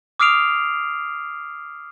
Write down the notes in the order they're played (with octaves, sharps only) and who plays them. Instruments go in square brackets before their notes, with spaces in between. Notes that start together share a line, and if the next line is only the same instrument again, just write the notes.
[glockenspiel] D6 D#6 F6 C7 D7 F7